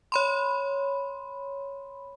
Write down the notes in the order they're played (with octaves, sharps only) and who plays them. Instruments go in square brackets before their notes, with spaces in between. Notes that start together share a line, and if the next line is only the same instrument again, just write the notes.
[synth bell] C#5 B5 C6